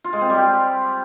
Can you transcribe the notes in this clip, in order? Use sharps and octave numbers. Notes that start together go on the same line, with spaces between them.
F4
G#3
C4
G3
G4